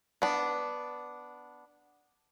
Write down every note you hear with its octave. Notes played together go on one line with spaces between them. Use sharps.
B3 D4